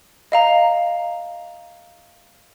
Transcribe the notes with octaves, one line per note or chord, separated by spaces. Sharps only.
D#5 F5 A#5